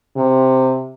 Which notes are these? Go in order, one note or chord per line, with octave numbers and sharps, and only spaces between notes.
C3